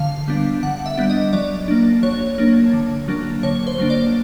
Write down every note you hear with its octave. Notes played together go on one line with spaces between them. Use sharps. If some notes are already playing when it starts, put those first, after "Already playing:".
Already playing: D3 F5
G3 B3 D4
D3 F#5
E5
G3 B3 D4
D#5
F#3 D5
A#3 D4
F#3 C#5
A#3 D4
D3
F#3 A#3 D4
D3 C#5
C5
F#3 A#3 D4
D5